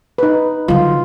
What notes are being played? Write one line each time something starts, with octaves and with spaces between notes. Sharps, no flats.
D#4 B4
D3 F#3 F4